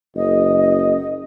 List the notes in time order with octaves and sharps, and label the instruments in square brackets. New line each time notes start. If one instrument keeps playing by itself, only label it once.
[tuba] F#1 [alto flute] D#5